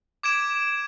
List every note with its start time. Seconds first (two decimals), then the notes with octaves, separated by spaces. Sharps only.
0.23 D6 G#6 D7 E7